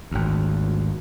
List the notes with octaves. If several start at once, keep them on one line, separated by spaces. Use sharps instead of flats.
G#1 D2